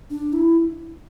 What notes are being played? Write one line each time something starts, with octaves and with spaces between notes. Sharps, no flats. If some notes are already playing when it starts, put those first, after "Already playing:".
D4
E4